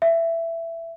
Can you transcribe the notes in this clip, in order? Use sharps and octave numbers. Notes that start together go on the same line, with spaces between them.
E5